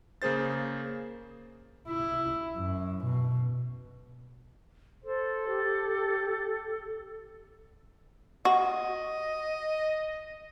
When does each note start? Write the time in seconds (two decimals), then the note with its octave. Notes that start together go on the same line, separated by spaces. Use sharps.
0.22 C#3 A#3 G#4 C5 A6
1.88 E4
2.56 F#2
3.05 B2
5.04 A4 C5
5.48 G4
8.45 F#4 D#5